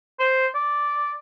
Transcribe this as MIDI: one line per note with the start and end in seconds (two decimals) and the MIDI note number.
0.20 0.47 72
0.55 1.13 74